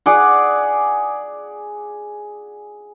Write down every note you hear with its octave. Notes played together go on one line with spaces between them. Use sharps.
G#4 D5 F#5